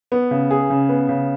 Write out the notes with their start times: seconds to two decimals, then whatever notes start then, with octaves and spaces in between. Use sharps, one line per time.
0.12 B3
0.31 C#3
0.51 G#4
0.70 C#3
0.89 B3
1.09 C#3